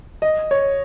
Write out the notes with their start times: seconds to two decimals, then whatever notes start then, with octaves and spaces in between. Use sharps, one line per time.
0.22 D#5
0.51 C#5